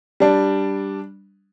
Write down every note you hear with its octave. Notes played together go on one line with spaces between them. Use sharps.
G3 D4